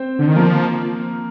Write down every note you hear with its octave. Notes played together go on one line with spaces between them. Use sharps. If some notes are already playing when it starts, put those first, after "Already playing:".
Already playing: C4 C5
D3
D#3
F3 A#3 A#4